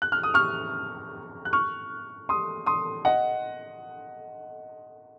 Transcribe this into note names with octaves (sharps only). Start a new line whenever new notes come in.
F#6
F6
D#6
C#6 F6
F#6
C#6 F6
C6 D#6
C6 D#6
D#5 F#5